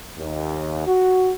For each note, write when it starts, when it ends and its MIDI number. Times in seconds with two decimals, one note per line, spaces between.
0.18 0.85 39
0.87 1.33 66